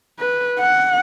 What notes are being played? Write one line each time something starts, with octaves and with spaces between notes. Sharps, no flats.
B4
F#5